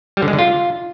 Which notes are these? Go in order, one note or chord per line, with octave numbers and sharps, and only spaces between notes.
G3
D3
G#3
D3
F4